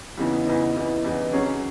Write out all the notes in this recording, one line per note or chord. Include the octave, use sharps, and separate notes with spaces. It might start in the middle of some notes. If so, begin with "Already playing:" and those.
E2 C#3 E3 B3 D#4
E2 C#3 E3 B3 D#4
E2 C#3 E3 B3 D#4
E2 C#3 E3 B3 D#4
F#3 C#4 G#4